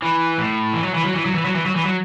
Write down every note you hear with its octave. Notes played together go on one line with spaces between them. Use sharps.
E3
A2
E3
F#3
E3
F#3
E3
F#3
E3
F#3
E3
F#3
E3
F#3